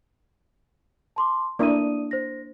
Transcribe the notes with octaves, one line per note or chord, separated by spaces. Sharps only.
A5 C6 D6
A#3 D4 E4 D5 D#6 D#7
C5 A#6